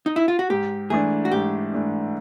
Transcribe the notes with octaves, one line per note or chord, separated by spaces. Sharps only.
D#4
E4
F4
F#4
G#2 G4
E3 A3 D4 G#4
F#4
G#2 G4
E3 A3 D4